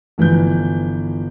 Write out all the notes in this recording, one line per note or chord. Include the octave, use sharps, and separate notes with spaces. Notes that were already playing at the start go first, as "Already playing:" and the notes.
G1 E3 F3 G6